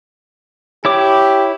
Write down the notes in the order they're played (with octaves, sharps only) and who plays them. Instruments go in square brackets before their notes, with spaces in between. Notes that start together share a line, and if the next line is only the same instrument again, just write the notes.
[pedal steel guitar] E4 C#5 D6 [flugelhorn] G4